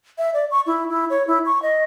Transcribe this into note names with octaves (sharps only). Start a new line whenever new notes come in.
E5
D5
C#6
E4
E4
C#5
E4
C#6
D#5